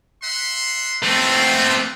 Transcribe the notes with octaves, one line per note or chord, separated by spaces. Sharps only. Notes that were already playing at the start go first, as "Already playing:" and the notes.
E5 F#5 C6
A3 C4 F4 B4